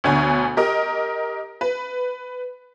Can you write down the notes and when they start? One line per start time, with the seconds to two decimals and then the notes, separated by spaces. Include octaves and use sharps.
0.04 D2 B2 D3 C#5 G#5
0.57 G4 A#4 D#5
1.61 B4